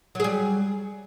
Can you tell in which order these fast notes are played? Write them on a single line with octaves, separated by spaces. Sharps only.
F#3 G#4 G3